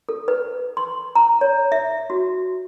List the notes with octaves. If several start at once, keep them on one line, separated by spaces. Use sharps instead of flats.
A4
B4
C6
A#5
C#5
E5
F#4